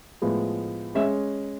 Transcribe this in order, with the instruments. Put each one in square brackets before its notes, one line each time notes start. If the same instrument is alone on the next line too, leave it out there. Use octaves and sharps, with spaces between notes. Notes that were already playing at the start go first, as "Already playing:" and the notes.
[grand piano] A2 F3 G#3 B3
G#3 C#4 E5